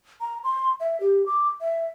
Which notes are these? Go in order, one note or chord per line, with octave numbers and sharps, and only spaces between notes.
A#5
C6
E5
G4
D6
E5